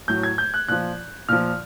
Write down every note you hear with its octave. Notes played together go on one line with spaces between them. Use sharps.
A2 F#3 G6
G#6
G6
F#6
A#2 F3 F#6
A#2 F3 F6